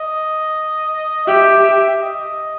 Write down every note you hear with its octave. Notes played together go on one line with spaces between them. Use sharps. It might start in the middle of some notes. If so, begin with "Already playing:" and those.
Already playing: D#5
G4 E5
D#5